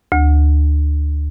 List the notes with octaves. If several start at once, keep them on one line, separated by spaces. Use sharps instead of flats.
D2